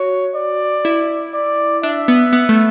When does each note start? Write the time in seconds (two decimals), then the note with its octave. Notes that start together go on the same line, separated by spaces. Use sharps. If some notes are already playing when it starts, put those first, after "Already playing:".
Already playing: F#4 C#5
0.35 D5
0.85 E4
1.34 D5
1.83 D4 E5
2.08 B3
2.33 B3
2.49 A3